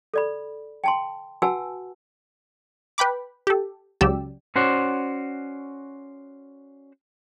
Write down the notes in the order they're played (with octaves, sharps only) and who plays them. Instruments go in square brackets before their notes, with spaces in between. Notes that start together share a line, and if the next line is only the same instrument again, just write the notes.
[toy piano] A4 D5 B5
G5 A5 C6
F#4 B4 F#5 G#5 A5 E6
[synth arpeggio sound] B4 G5 B5 D6
G4 A4
C#2 C#3 F#3 G4 D5 E6
[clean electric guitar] C#4 F#4 C5 D5 F#5